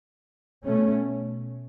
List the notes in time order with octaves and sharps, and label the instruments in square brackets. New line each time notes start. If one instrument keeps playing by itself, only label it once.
[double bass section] B2 A3 C#4